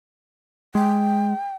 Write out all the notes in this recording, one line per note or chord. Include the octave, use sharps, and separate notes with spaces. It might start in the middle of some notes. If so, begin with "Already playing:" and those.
G#3 G5